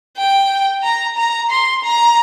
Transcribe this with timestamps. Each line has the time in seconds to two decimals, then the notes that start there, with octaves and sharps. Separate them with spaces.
0.17 G5
0.83 A#5
1.17 A#5
1.50 C6
1.84 A#5